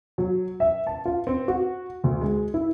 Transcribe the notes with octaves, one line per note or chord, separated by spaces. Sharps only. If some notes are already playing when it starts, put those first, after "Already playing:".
F#3
E5
A5
F4
C4
F#4
D2
G#3
E4